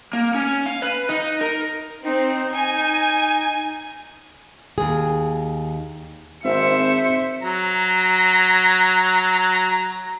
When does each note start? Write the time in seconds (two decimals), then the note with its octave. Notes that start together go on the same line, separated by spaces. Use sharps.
0.13 A#3
0.35 C#4
0.66 F5
0.82 B4
1.09 D#4
1.41 A#4
2.04 C4 D#4
2.51 G#5
4.78 D#2 G#4
6.45 G#1 C4 C5 E5 C#7
7.42 F#3 A#5